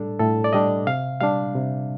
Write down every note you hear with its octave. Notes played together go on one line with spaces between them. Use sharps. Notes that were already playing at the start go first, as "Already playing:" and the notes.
Already playing: A2 G3 D4 A4
A2 A4
D5
G3 D4 D#5
C3 F5
G3 D4 F5
C3